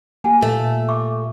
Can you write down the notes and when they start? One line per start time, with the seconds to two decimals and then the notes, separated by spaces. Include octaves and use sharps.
0.24 A#3 G4 F#5 G#5 A5
0.42 A#2 A3 A4
0.89 E5 C#6 D6